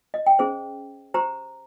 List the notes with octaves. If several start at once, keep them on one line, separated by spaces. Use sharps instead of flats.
D#5
G5
C#4 G#4 C5
G4 C5 A#5